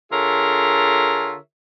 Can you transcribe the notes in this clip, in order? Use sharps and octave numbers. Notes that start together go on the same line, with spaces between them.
D3 F4 G#4 A#4 C#5 E5